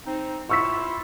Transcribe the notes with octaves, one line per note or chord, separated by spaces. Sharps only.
C4 D#4
E4 F4 C#6 E6 B6